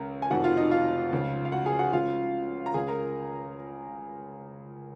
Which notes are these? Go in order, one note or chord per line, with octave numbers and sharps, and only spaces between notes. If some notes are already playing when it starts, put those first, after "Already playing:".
Already playing: C#2 C#3 A#4 A#5
G#5
F1 F2 D#3 F#4 F#5
F4 F5
D#4 D#5
F4 F5
C#2 C#3
F5
F#4 F#5
G#4 G#5
F#4 F#5
C#2 C#3 F4 F5
A#5
C#2 C#3 G#4 G#5
A#4 A#5